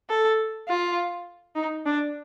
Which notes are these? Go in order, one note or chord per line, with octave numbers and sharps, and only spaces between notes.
A4
F4
D#4
D4